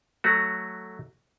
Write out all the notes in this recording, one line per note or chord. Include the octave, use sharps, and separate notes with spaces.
F#3 A3 F#4